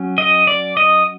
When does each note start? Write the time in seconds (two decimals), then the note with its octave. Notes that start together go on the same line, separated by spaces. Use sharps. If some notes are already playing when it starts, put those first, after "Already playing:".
Already playing: F#3 C#4
0.18 D#5
0.47 D5
0.77 D#5